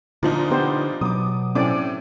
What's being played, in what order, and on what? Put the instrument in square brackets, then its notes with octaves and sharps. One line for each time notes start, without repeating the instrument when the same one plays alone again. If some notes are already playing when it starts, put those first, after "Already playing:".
[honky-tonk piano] A#2 F3 D#4 [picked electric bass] D3
[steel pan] B3 G4 C5
[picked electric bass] B2 F#3 [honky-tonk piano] D6 D#6
[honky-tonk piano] A2 D6 [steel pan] C4 C#4 D5